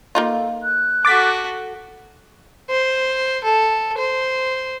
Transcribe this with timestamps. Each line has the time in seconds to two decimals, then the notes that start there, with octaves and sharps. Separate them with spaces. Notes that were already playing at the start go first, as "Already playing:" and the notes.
0.15 A#3 D#4 F4 A4
0.63 F#6
1.05 F#4 A4 D6 A6 B6
2.70 C5
3.44 A4
3.98 C5